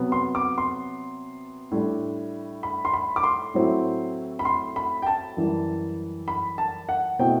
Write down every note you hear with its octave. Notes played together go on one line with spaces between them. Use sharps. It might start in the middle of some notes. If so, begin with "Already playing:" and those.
Already playing: C3 F#3 B3
C6
D6
C6
A2 G3 D4
B5
C6
B5
D6
C6
A2 F#3 C4 E4
B5
C6
B5
G5
A5
F#2 E3 G3
B5
A5
F#5
B2 A3 C4 E4 G5